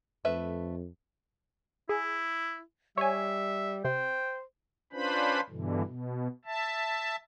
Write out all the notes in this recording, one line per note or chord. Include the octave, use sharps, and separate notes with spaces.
F2 A3 B4 E5
E4 G#4
G3 C#5 E5 G#5
C3 C5 G5
C#4 D4 F4 B4 C5 B5
G2 B2 D3 E3
B2
E5 A5